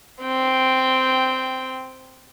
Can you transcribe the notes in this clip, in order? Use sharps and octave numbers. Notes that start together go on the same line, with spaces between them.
C4 G5